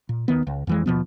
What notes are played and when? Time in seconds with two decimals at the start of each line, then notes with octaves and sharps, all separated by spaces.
0.09 A#2
0.28 D#2 D#3 B3
0.47 C#2
0.67 F2 E3 G#3
0.86 D#2 B2 F3 B3